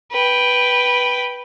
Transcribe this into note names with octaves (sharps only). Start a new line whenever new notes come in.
B4 G5